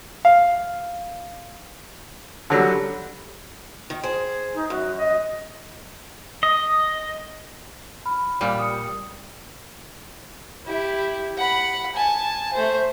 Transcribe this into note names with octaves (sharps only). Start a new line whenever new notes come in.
F5
D3 F#3 G3
D#3
G#4 C5
D#4
F#2 F#4
D#5
D#5
B5 F6
A#2 G3
D#6 C#7
E4 G4
F#5 B5
G#5 A5
A3 C5